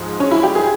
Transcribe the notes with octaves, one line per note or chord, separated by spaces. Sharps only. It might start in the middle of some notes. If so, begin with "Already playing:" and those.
Already playing: G#2 F3 G#3
C#4
E4
G4
G#4